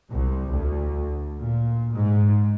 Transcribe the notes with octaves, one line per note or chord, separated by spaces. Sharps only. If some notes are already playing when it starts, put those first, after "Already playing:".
C2
D2
A#2
G#2